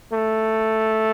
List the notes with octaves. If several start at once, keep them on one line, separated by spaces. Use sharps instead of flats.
A3